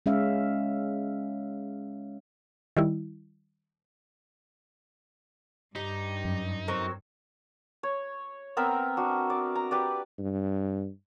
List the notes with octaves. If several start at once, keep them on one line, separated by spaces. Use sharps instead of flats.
G#3 C#4 E5 F5
D#3 G3 E4
G2 D#4 G4
F#2
F#3 C4 A#4
C#5
B3 C4 A#4 E5
D4 F#4
D5
A#5
G4 B4 D5
G2